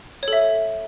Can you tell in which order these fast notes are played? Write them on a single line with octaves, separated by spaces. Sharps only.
C#5 A4 E5